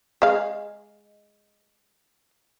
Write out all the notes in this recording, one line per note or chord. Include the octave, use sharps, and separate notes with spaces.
G#3 F5